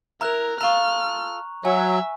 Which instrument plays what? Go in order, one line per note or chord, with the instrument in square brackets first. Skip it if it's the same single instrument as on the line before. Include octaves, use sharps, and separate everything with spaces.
[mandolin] E4 F6 [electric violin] A#4 [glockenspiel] A#5 F#6 F7
[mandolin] F4 A4 [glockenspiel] A#5 C#6 [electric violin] F6
[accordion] F#3 [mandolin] F#4 [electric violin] E5 [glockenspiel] G#5